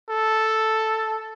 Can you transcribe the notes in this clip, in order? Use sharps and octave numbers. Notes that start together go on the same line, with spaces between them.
A4